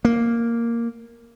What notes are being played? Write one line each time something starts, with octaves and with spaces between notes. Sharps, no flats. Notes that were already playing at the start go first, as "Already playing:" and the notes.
A#3